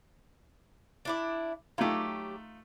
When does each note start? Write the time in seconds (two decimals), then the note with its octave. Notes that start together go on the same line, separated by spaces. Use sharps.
1.05 D4 E4 D5
1.78 F#3 A3 D#4 F4 G4